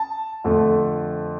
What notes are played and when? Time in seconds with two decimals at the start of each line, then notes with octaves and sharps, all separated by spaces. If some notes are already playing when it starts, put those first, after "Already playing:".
Already playing: A5
0.44 F2 D3 A3